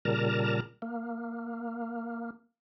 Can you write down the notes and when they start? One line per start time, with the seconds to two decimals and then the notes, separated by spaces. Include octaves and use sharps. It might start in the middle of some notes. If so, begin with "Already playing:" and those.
0.05 A#2 C#3 G3 A#4 A5 A#5
0.82 A#3